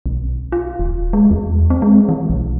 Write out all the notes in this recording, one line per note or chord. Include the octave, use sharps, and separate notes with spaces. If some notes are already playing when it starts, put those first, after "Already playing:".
B1
F4
D#1
G#3
E2
C4
G#3
E3
B1